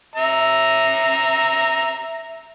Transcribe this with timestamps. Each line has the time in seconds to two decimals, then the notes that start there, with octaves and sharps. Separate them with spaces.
0.16 E5 A#5